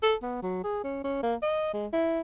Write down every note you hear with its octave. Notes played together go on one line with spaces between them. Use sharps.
A4
B3
F#3
G#4
C#4
C#4
A#3
D#5
G#3
E4